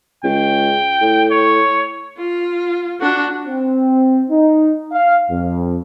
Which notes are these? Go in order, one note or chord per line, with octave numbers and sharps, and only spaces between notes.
C#2 G5
A2
C#5
F4
D4 F#4
C4
D#4
F5
F2